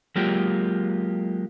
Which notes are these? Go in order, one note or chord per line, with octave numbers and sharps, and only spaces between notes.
F#3 G#3 A#3 F4 G4